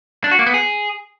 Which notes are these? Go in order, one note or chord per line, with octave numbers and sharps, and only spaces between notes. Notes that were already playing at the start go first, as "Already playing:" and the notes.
D4
F#4
A#3
B3
G#4